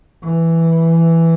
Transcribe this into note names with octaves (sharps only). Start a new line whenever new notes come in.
E3